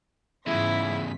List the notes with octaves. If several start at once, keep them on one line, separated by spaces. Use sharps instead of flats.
E2 G#2 C#3 E4 F4 B6